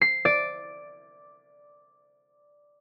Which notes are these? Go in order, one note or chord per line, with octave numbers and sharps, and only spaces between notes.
C7
D5